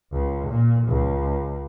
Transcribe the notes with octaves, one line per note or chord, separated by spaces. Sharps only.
C#2
A#2
C#2